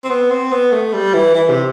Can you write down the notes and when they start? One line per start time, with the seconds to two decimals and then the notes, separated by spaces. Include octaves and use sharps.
0.04 C4
0.10 B3
0.31 C4
0.52 B3
0.72 A3
0.93 G3
1.14 E3
1.35 E3
1.49 C3